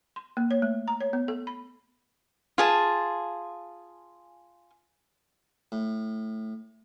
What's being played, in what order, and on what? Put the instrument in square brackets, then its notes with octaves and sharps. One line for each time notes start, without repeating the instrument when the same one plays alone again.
[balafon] C6
A#3
C#5
A3
A#5
C#5
B3
A4
B5
[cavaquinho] F4 G#4 A5
[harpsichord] A2